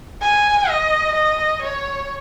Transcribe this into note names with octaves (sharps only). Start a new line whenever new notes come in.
G#5
D#5
D#5
C#5